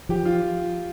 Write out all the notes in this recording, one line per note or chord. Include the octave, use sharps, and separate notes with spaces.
F3 G4
F4